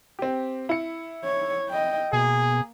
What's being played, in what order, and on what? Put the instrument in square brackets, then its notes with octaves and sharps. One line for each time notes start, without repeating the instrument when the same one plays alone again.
[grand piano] C4 G4
E4 C#7
[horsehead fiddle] C#5
D#5 G5
[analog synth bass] B2 [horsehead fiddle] A#3 [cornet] G#4